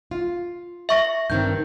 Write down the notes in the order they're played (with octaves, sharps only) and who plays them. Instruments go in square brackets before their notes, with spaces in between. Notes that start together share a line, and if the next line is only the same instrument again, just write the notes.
[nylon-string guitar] F4
[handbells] E5 C#6 A#6
[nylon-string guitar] G2 D#3 C4 [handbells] G6